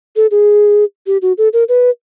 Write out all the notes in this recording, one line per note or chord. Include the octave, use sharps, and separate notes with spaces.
A4
G#4
G4
F#4
A4
A#4
B4